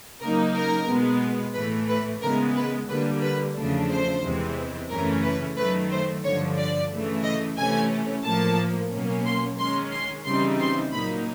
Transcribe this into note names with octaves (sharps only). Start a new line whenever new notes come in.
C#3 F#3 A#3 D#4 A#4
A#4
B2 G#3 B3
A2 E3 A3 B4
B4
C#3 E3 G#3 B3 A#4
B4
D3 G3 A#3 B4
B4
E2 C#3 F3 A3 D4
C5
E2 C3 E3 G#3 C4
F#2 C#3 E3 A3 C#4 A#4
B4
D#3 F#3 A3 B4
C5
G2 D3 F3 C#5
D5
C#3 E3 A3
D#5
C3 E3 A3 C#4 G#5
A2 F3 A#3 A5
B2 F#3 A#3 C#4
C6
D#3 G#3 C#4 C6
C6
C#3 E3 G3 C4 D#4 C6
C6
A#2 F#3 A#3 D#4 B5